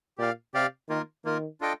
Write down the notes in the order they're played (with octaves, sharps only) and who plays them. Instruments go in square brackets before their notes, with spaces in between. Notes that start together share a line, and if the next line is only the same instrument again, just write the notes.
[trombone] A#2 [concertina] G4 D5 F5
[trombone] C3 [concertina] G4 D5 F5
[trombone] D#3 [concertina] A#3 F4 A#4
[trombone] D#3 [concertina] A#3 F4 A#4
[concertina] D4 F4 A4 D#5 G5